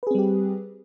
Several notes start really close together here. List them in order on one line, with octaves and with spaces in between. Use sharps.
B4 G#4 C4 G3 G4